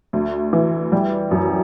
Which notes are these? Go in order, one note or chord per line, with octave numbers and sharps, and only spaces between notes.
D2
E3
G3
F#2